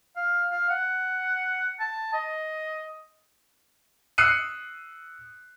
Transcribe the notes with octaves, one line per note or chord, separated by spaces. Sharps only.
F5
F5
F#5
A5
D#5
D#6 E6 F#6 C7 C#7 D#7